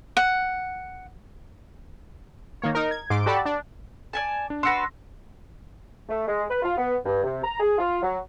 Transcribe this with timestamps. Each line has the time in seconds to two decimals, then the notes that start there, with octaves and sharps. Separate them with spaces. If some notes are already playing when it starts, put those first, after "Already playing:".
0.17 F#5
2.62 D#3 A#3 C#5
2.75 D#4 A#4
2.91 G#6
3.10 G#2 C6 D6 D7
3.26 F#4 G4 A4 D5 A5 B5
3.45 D4
4.13 D5 G#5 A5
4.50 D4
4.63 D4 F#4 B4 C6 E6 A#6
6.09 A3
6.27 G#3
6.49 B4
6.63 F4
6.77 B3
7.05 G2
7.24 C3
7.44 A#5
7.60 G#4
7.78 F4
8.03 F#3